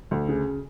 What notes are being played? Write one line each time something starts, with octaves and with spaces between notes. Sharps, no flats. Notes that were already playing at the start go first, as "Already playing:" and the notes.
D2
C#3